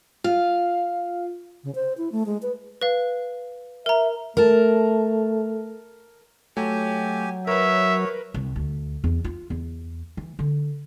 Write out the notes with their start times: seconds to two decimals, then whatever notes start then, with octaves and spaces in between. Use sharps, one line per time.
0.24 F4 F5
1.63 C#3
1.75 C5
1.98 E4
2.12 A3
2.26 G#3
2.42 B4
2.81 B4 F5
3.86 A#4 E5 A#5
4.37 A3 A#4 A5
6.57 F#3 A3 G4 G#5
7.47 A#4 B4 C#5 E5
8.34 C2
8.56 D2
9.04 E2
9.25 F4
9.50 E2
10.17 E3
10.39 D3